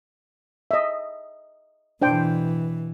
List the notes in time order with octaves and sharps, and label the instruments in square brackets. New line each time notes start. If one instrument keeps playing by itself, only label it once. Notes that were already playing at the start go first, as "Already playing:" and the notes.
[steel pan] D#5 E5
[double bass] B2 E3 [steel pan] D4 C5 G5